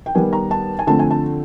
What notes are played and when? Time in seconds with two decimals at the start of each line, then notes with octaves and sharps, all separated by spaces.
0.06 G5
0.15 D#3 G3 B3 G#5
0.33 A#5
0.51 A5
0.79 G#5
0.87 D3 F3 A3 C4 A5
0.99 G#5
1.11 A5